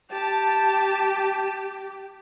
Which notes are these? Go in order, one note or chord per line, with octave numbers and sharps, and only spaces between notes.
G4 A5